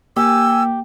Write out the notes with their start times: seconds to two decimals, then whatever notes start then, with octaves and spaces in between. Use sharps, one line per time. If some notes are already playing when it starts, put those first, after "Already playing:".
0.16 A#3 G4 G#5 E6